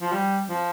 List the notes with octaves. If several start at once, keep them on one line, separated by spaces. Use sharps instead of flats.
F3
G3
F3